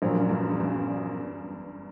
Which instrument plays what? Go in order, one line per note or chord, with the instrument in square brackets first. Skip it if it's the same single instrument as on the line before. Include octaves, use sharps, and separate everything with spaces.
[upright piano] A#1 A#2 F#3 [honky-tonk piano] G2
[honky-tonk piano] F#2
G1 G2
E2
F#2